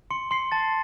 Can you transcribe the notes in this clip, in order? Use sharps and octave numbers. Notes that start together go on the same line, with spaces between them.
C6 C#7
C6 C7
A5 A6